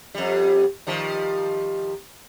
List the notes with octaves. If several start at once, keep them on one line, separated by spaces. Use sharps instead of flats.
F2 G3
D#3 F3 G3